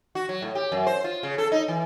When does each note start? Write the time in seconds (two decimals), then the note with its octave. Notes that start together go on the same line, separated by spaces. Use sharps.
0.15 F#4
0.29 F#3
0.42 A2
0.55 G4
0.72 F#2
0.87 C5
1.04 F4
1.23 C#3
1.38 A4
1.52 D#4
1.68 E3